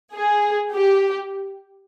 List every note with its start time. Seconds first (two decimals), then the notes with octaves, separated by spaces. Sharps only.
0.13 G#4
0.72 G4